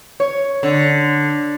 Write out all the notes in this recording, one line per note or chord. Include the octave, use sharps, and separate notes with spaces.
C#5
D3